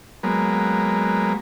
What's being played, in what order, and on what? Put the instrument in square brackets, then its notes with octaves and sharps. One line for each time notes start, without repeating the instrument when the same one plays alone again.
[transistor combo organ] F#3 G#3 A#3 B3